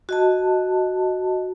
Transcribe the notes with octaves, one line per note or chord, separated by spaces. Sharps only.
F#4 D#5 A5